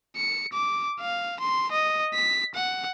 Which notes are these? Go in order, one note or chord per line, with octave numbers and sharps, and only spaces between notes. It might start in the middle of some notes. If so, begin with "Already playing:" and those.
C#7
D6
F5
C6
D#5
B6
F#5